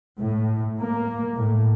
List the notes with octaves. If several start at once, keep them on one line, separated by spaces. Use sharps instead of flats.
A2
A#3
A2